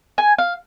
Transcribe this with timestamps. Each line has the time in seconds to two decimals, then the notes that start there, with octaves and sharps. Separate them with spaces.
0.18 G#5
0.38 F5